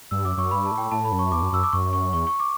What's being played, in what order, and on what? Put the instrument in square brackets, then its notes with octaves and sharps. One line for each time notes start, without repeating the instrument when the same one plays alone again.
[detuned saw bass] G2 [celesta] E6
[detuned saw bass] F#2 [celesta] D6
[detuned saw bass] F#2 [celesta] C#6
[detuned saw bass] G2 [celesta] B5
[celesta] A5
[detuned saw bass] A2
[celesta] G5
[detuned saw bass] A2 [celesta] A5
[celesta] B5
[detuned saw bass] F#2
[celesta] C#6
[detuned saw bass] E2 [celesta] D6
[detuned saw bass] F#2
[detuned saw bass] F#2 [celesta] E6
[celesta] D6
[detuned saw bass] F#2 [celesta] C#6
[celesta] C#6
[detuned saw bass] E2 [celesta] C#6
[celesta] C#6
D6